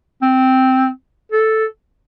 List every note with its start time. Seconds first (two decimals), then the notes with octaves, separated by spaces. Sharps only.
0.22 C4
1.32 A4